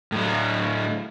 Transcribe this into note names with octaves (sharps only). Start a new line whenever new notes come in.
A2 F#3